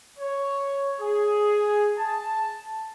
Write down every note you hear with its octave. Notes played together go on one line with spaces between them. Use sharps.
C#5
G#4
A5